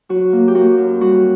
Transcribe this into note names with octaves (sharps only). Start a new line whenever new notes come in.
F#3 F#4
A#3
G4
A#3 F#4
F#2
G3 F#4